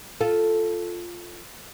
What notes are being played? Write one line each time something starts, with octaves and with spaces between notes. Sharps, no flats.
F4 A4